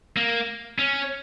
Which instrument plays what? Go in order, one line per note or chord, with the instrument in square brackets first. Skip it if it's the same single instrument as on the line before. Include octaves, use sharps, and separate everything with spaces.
[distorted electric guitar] A#3
C#4